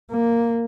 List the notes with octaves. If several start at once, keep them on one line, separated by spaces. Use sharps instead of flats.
A#3